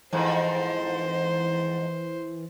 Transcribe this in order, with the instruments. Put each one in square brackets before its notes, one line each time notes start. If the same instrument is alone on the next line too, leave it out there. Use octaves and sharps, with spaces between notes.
[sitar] F2 G#2 [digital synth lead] E3 [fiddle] C5